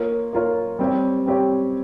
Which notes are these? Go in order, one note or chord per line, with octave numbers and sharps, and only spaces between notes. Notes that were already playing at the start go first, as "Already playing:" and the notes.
Already playing: A#3 F4 A#4 C#5
A#3 F4 A#4 C#5
G3 C4 G4 C#5
G3 C4 G4 C#5